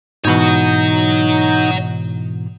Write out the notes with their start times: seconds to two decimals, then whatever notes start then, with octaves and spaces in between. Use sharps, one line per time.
0.25 G#2 B2 E3 D#4 C#5 F#5